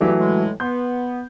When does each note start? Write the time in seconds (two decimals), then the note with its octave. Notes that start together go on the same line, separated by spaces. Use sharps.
0.01 G2 E3 F#3 A3 G4
0.18 A2 G#3
0.60 B3 C6 G6